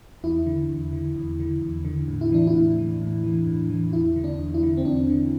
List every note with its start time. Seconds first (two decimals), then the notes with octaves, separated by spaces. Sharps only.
0.24 E2 E4
0.46 D3
0.69 E2
0.93 D3
1.16 E2
1.40 D3
1.62 E2
1.85 D3
2.08 A2
2.21 E4
2.32 E3 D4
2.47 E4
2.55 A2
2.78 E3
3.01 A2
3.24 E3
3.47 A2
3.70 E3
3.93 E2 E4
4.16 D3
4.24 D4
4.39 E2
4.54 E4
4.63 D3
4.77 C4
4.85 E2 D4
5.09 D3